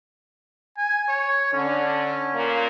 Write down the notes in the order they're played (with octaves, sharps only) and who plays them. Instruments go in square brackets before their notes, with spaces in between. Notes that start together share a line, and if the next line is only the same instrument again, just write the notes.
[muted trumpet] G#5
C#5
[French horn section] D3 [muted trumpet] C#4
[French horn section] A#2 A#3